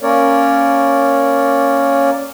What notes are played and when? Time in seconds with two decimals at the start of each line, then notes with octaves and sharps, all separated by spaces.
0.01 A#3 C#4 A#4 C#5 D5